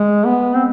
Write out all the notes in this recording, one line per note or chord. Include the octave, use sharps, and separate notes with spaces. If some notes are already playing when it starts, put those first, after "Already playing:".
Already playing: G#3
B3
C4